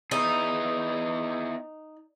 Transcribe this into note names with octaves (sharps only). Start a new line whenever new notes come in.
B3 D#4 E4 G#4